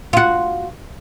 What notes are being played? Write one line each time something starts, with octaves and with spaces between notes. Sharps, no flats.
F4 F#4